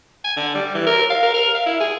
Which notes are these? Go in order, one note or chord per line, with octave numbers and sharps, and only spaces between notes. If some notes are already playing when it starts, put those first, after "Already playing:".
G#5
D3
G3
E3
A#4
F5
A#4
A#4
F5
E4
G#4